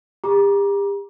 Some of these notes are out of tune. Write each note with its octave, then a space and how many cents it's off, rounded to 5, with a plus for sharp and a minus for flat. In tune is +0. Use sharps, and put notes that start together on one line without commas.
G4 +40 A#5 +30 D6 +5